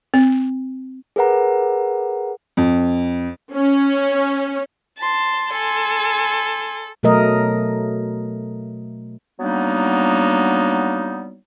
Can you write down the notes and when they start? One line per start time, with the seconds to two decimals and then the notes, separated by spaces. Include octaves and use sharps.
0.14 C4
1.16 G#4 A#4 B4 F#5 A#5
2.57 F2
3.53 C#4
4.97 A5 C6
5.52 A4 G#5 C6
7.03 B2 F#3 A3 A#4 D#5
9.40 F#3 G3 A#3 B3 D4 D#4